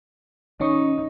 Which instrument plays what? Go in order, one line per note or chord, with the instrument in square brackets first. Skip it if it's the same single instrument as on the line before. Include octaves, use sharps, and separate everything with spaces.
[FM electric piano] D#3 C#4 C#6 [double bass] D#4